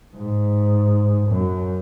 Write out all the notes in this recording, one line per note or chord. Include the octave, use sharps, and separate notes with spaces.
G#2
F#2